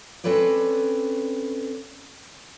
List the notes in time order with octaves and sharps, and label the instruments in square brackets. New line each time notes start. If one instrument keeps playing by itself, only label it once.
[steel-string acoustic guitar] C4 C#4 A4 B4 C#5 D5